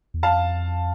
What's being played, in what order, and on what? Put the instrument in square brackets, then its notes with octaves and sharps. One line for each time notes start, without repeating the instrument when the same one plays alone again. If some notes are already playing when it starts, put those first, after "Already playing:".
[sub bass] E2
[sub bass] F2 [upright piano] F5 A5